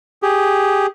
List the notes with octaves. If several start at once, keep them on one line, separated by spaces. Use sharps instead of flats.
G4 G#4